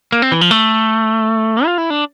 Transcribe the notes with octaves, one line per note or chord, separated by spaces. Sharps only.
A#3
C4
E3
F3
A3
F4
E4
D4